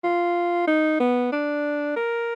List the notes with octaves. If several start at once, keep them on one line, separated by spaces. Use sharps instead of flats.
F4
D#4
B3
D4
A#4